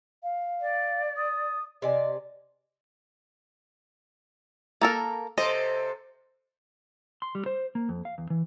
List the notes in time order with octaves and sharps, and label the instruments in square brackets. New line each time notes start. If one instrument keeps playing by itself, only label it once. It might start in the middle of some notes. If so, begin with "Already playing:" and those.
[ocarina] F5
[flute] D5
[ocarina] D#6
[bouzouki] C3 D5 G#5 [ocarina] D#5
[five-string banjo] A#3 A4 A#4
[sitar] C3 A4 C5 [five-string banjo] D#5
[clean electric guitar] C6
G3
C5
A#3
F2
F5
E2
E3